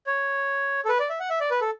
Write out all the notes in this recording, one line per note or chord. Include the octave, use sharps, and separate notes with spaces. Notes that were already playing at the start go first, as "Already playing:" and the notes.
C#5
A4
B4
D5
E5
F#5
E5
D5
B4
A4